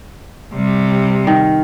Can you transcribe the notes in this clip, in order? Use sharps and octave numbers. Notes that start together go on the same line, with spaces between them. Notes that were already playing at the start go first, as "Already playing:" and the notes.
C3 G3
D#3